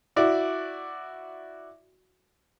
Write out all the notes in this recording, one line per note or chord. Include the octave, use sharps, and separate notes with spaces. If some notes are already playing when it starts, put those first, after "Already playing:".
E4 F#4 D5